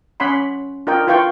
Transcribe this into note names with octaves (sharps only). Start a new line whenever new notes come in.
C#4 C#5 F#5 B5 C6
D4 F4 A#4 D#5 G5
E4 F4 B4 F5 G5 C#6